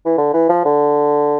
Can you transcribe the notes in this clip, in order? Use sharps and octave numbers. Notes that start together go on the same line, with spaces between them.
E3
D3
E3
F3
D3